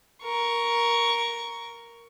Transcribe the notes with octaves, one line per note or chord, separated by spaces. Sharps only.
A#4 C#6